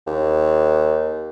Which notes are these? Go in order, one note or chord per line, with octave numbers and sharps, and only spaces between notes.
D#2